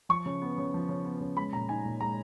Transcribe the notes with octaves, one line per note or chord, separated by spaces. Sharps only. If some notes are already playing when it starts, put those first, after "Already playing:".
F3 C#6
C#3
B3
C#3
F3
C#3
B3
C#3
G#3 B5
A#2 A#5
D#4 G#5
A#2
G#3 A#5